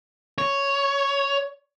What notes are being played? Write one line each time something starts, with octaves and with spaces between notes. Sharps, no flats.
C#5